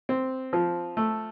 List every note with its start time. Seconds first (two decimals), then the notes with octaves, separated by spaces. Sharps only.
0.09 C4
0.53 F3
0.97 A3